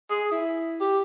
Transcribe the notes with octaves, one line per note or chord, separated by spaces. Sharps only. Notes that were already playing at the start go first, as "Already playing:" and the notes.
G#4
E4
G4